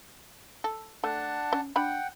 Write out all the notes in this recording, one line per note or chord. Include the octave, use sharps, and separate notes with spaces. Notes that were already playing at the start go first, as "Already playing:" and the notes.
A4
A3 D4 F#5 A5
C#4
D4 F#5 G5 B5